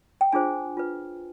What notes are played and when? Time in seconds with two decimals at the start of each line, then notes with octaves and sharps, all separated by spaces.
0.21 G5
0.32 D4 F4 G#4 C5 G#5
0.77 F4 B4